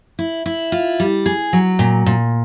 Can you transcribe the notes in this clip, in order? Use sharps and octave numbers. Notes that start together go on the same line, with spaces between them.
E4
E4
F4
G3
G#4
F#3
A#2
A#2